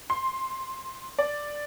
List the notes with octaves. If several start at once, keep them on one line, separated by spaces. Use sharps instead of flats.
C6
D5